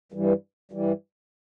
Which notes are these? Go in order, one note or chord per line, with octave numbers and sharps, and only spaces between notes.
G2 E3 G3
G2 E3 G3